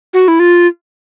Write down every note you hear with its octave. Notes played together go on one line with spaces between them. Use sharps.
F#4
E4
F4